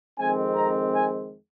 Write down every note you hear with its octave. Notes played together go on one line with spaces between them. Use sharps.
F2 D#3 G#3 C4 G#5
A#5
G#5